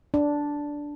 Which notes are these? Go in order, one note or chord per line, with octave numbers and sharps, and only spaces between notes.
D4